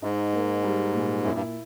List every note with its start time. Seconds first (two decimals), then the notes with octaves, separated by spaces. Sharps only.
0.02 G#2 D#4
0.33 A#3
0.64 G3
0.93 A#2
1.24 F#2 E4
1.33 G2